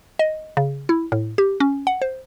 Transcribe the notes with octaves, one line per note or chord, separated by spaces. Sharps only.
D#5
C#3
E4
A2
G4
C#4
F#5
C5